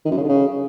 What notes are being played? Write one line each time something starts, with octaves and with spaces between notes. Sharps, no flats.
D#3
F#2
C#3
D3
C#3